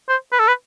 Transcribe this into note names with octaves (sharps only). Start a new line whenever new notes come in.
C5
B4
A4
B4